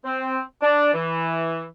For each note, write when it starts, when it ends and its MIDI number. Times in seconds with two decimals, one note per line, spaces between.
0.05 0.40 60
0.62 0.93 62
0.94 1.64 52